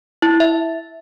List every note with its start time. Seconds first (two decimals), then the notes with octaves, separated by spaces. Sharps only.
0.22 E4
0.40 E5